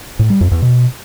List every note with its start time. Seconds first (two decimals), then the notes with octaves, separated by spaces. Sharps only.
0.19 A2
0.30 G3
0.41 F2
0.51 E2
0.62 B2